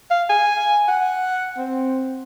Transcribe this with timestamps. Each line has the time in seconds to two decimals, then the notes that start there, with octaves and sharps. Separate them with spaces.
0.10 F5
0.30 G#5
0.88 F#5
1.58 C4